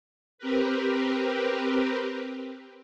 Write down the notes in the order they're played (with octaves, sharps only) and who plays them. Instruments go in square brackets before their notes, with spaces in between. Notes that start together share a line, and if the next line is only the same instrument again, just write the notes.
[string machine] C4 G4 A#4 B4